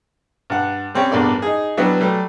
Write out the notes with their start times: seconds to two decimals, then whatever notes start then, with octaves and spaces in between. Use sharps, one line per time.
0.50 G2 F#5
0.95 G3 C4 C#4 G4 C#5
1.12 A1 E2 G2 A#4 D5
1.42 D#4 G#4
1.77 F#3 G3 B3 D4 E4 F#4
2.00 F#3 G3 A3